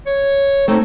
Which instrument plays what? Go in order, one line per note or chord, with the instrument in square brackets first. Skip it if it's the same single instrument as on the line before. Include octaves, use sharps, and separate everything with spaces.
[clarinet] C#5
[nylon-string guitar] A3 C4 [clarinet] D#4